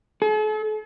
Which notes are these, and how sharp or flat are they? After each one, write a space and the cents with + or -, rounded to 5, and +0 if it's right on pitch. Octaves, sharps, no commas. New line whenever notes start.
A4 -45